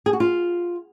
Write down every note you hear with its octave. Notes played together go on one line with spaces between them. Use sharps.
G#4
F#4
F4